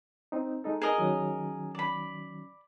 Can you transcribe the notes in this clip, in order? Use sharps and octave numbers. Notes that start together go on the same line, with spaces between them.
C4 D#4
G#3 D#4 A4
G#4 A#4 D#5
D#3 F#3 C#4
D5 B5